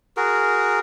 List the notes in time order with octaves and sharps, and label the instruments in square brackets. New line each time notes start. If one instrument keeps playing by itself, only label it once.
[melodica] F#4 G#4 A#4